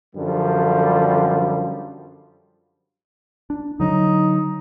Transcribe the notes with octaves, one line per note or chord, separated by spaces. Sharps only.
F#2 D3 F3 G3
D4
D3 F#3 D#4